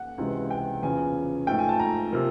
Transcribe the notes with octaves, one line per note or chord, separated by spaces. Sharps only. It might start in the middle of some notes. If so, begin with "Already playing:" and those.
Already playing: F#5
C#2 C3 E3 G#3
G5
E2 C#3 F3 G#5
G#2 F3 A3 G5
G#5
A5
A#5
C3 F3 A#3